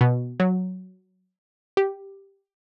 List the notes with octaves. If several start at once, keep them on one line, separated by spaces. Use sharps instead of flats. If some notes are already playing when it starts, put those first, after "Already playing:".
B2
F#3
G4